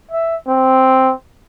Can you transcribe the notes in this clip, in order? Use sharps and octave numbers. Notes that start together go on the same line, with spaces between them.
E5
C4